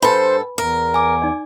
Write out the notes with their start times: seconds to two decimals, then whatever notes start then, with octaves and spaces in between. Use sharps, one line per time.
0.02 G2 A4 B4 C5 G#5 B5
0.58 E2 A#4
0.94 G#5 D6
1.22 D#4 D5